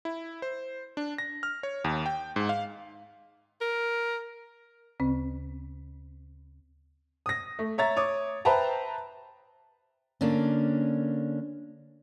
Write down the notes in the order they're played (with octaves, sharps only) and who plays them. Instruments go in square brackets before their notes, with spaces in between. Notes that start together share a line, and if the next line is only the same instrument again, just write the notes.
[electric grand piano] E4
C5
D4
A#6
F6
C#5
D#2
G5
G#2
F5
[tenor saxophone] A#4
[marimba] D2 C#3 C4
[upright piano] D#6 A#6
A3
C#5 E5 A#5 A6
C#5 D6 D#6
B4 C5 E5 G5 A5 A#5
[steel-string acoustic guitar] D3 A#3 C#4 D4